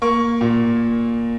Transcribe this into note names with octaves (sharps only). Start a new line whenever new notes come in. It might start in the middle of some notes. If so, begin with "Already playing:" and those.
A#3 C#6
A#2